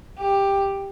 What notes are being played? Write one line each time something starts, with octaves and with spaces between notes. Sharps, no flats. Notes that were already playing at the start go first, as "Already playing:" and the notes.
G4